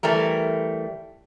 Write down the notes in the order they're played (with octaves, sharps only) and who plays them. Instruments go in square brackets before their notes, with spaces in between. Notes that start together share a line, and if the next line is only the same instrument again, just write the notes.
[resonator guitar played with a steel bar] E3 G3 A3 A#4